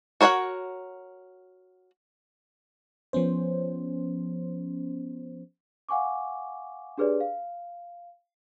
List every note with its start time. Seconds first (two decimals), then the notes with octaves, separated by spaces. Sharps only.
0.21 F#4 A#4 C#5 F5 F#5
3.13 F3 B3 C#4 C5
5.89 F5 F#5 G#5 C#6 D6
6.98 D4 G4 G#4 B4 C#5 D5
7.21 F5